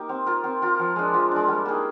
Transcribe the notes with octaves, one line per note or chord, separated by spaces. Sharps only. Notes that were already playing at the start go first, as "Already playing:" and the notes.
Already playing: A#3 D#4 G4
C4
F4 A#4
C4
F4 A#4
F3
G#3 D4
F3
G#3 D4
G3
A#3 D#4 G#4